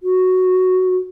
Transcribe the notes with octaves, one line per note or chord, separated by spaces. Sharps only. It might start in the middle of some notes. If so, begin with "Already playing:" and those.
F#4